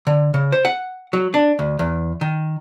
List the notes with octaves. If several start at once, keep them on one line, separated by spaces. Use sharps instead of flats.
D3
C#3
C5
F#5
F#3
D4
D2
E2
D#3